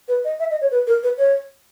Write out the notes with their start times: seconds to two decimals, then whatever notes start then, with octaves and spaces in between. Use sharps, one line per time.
0.08 B4
0.24 D#5
0.40 E5
0.51 D#5
0.61 C#5
0.71 B4
0.87 A#4
1.03 B4
1.18 C#5